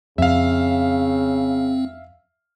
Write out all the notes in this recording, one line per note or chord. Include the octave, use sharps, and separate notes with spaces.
F2 C#3 C4 E5 F5